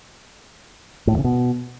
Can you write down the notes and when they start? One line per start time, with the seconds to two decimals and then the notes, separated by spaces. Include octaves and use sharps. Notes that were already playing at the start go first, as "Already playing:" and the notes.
1.07 A2
1.13 E2
1.19 C#3
1.24 B2